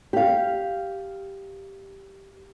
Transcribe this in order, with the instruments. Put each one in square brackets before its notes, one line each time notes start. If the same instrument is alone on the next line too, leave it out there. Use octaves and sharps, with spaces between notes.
[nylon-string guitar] G4 F5